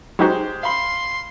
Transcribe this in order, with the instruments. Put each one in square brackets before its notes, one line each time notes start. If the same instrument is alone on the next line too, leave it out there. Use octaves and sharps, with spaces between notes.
[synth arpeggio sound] F#3 D#4 F#4 [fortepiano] G#3 G4 C5
[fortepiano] F5 B5 [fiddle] C6